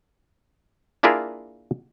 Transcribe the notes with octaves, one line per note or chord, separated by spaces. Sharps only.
A#3 D4 E4 F4 G#4 A#4